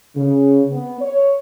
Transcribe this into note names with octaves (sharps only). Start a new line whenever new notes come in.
C#3
B3
C#5